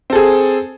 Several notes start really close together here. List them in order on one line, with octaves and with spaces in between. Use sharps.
C4 A4 G#4